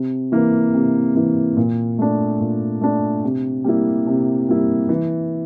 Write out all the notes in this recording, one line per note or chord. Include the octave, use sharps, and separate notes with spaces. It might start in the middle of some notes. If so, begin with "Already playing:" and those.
Already playing: C3
E3 A#3
C3
E3 A#3
A#2
A3 D4
A#2
A3 D4
C3
G3 A#3 E4
C3
G3 A#3 E4
E3